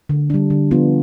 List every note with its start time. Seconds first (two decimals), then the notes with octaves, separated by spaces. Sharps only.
0.09 D3
0.30 G3 D4
0.50 D3
0.71 F3 B3 D4 F4